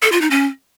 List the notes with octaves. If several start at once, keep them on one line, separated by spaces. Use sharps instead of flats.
A4
F4
D#4
C#4